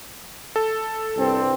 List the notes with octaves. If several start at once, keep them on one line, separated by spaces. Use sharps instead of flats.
A4
C2 G2 C4